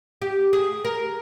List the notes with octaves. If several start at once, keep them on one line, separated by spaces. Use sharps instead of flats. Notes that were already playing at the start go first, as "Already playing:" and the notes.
G4
G#4
A#4